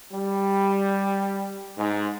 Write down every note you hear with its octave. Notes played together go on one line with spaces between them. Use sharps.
G3
G#2